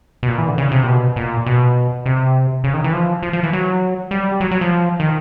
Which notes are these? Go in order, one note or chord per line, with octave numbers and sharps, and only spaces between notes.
B2
A#2
E3
D3
C#3
C3
A#2
B2
A#2
B2
C3
C#3
D#3
E3
F3
F3
F3
E3
F#3
G3
F#3
F#3
F3
D#3